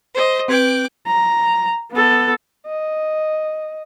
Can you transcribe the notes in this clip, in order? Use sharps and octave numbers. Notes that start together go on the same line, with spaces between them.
C5 D#5
C4 B4 G5 D6 F#6 G#6
A#5
B3 A4
D#5